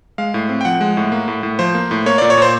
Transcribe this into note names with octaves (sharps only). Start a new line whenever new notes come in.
G#3 F5
A2
C4
G5
F3 F#5
G#3
A2
A#3
A2
A2
F3 C5
A#3
A2
A#3 C#5
A#2 D5
C#5
A#2 C5